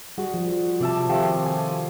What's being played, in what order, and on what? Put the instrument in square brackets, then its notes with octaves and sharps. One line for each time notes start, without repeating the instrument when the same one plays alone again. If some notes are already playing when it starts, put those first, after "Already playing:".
[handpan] G3 G#4 [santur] F#4
[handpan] F3
[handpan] C3 C4 F#4 [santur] D5 E5 A5
[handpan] D#3 [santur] F3 A3 G4
[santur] G#5